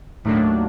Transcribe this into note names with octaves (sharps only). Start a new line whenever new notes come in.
D#2 A2 D#3 F#3 A#3 D4